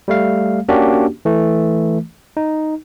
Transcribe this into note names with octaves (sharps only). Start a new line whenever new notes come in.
G3 A3 F5
A#3 C#4 D4 F#4 G4
E3 A3
D#4